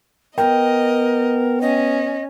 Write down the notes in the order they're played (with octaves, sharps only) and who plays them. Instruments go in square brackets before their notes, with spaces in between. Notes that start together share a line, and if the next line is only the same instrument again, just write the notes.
[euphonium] B3 [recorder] A#4 [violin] D#5 [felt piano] G5
[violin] C#4 [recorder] D#5